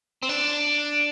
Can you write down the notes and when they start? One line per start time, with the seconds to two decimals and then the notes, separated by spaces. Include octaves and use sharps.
0.23 C4
0.29 D4